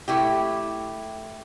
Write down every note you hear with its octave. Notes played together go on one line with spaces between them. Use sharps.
A3 E4 G4